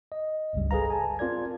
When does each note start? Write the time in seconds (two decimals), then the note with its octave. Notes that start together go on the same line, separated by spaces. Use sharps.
0.12 D#5
0.53 G1 C#2 G2 C#3 G3
0.71 G#4 A4 B4 F5 A#5
0.90 G#5 A5
1.19 C4 F4 A#4 D5 G#6